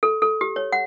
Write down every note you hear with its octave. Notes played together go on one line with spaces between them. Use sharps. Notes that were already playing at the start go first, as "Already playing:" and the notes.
A4
A4
G4
C#5
F#5